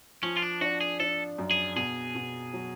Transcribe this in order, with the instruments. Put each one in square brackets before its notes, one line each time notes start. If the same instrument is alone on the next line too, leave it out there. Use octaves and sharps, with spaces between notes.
[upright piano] F3 [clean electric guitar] C#4
[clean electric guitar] F4
D4
[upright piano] D4 [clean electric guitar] F#4
[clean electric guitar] G#4
[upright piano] D4 [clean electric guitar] A4
[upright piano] F#2
[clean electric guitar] G#4
[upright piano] B2 [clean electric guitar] G#4
[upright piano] B2
F#3